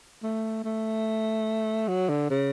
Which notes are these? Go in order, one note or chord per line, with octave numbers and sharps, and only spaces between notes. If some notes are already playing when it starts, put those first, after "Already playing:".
A3
A3
F#3
D3
C#3